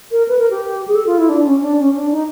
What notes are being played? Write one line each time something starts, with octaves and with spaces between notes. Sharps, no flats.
A#4
B4
A#4
G4
G#4
A4
F4
E4
D4
C#4
D4
C#4
D4
D#4